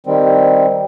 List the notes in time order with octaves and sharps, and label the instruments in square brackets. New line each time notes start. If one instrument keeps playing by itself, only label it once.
[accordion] D#3 G3 C4